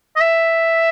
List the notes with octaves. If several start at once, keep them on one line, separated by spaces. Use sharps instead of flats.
D#5
E5